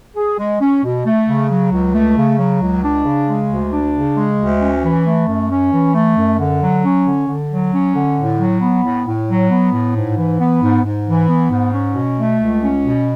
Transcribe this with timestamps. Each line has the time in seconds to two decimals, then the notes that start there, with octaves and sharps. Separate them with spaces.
0.16 G#4
0.38 G#3
0.61 C#4
0.84 B2
1.06 A3
1.27 C#3
1.50 F#3
1.73 C#2
1.95 A3
2.17 C#3
2.39 F#3
2.62 C#2
2.84 D4
3.05 C#3
3.27 G#3
3.49 D2
3.73 D4
3.94 C#3
4.17 G#3
4.39 D2
4.61 C#4
4.83 E3
5.06 A3
5.28 F#2
5.50 C#4
5.72 E3
5.94 A3
6.17 F#2
6.40 D3
6.61 F#3
6.84 C#4
7.06 D3
7.28 D3
7.51 F#3
7.73 C#4
7.95 D3
8.17 A2
8.39 F#3
8.61 B3
8.84 A2
9.07 A2
9.28 F#3
9.51 B3
9.73 A2
9.95 G#2
10.17 E3
10.40 B3
10.61 G#2
10.84 G#2
11.06 E3
11.29 B3
11.51 G#2
11.73 C#4
11.95 B2
12.18 A3
12.39 C#2
12.63 C#4
12.84 B2